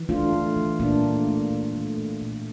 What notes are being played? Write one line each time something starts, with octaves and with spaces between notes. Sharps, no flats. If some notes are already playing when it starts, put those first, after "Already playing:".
Already playing: E3
A3 D4 F4
A3
E3
A#2 A#3 D4
A3
A3
A#2
A3
A#2
A#2